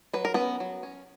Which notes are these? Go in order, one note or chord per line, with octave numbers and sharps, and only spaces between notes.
F#3 B4
A#4
B3 C#4 B4
F#3
C#4